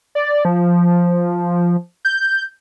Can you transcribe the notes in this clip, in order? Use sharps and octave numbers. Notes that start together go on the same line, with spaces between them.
D5
F3
G6